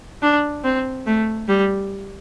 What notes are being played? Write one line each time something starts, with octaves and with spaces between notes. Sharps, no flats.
D4
C4
A3
G3